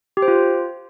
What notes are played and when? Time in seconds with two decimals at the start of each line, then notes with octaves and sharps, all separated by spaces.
0.17 G4
0.22 C5
0.28 F4